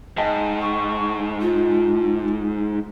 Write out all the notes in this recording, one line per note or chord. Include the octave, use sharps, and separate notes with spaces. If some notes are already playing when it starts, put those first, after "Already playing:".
G#2 D#5 G5 A5
C#6
F4